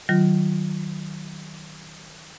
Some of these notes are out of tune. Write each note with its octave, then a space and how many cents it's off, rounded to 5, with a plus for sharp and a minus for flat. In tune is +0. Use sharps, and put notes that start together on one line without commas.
D#3 +0 F#3 +30 F4 +0